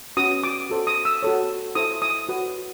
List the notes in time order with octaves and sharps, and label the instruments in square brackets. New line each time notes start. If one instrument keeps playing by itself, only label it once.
[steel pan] C#4 F#4 B4 D#6
D6
F#4 A4 C5
D#6
E6
F#4 A4 C#5
E4 A4 C5 D#6
D#6
F#4 B4